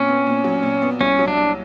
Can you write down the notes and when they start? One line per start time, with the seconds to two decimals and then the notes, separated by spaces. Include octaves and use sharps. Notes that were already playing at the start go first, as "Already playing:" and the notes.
Already playing: A#2 C4 C#4
0.08 B3
0.27 A#2
0.44 F#3
0.63 A#2
0.82 B3
1.01 C2 C#4
1.19 F#3
1.28 D4
1.37 C2